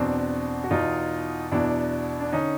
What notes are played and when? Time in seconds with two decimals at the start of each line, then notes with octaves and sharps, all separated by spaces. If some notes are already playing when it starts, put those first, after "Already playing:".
Already playing: E2 B2 C4 D4
0.64 F#4
0.71 E2 B2 D#4 F4
1.52 E2 B2 D4 E4
2.21 D4
2.32 D3 C#4 D#4